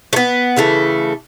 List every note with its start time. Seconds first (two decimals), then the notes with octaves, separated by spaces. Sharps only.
0.13 A3
0.16 B3
0.56 C#3 E3 A3